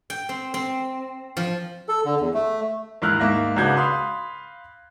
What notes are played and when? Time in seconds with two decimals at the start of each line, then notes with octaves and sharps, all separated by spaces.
0.10 G5
0.29 C4
0.54 C4
1.37 F3
1.88 A4
2.05 D3
2.20 E2
2.34 A3
3.02 D#2 G#2 E4 A#5 F6 F#6
3.20 G#2 A#3 E5 A#6
3.56 C#2 C#3 D4 F#4 G6 G#6
3.76 F5 B5 C6 D#6